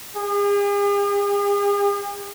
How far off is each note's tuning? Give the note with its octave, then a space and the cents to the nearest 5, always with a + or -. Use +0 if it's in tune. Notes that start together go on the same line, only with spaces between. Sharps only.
G#4 -45